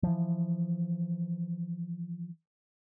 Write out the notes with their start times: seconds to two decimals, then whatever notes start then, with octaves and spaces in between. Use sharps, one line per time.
0.03 E3 F3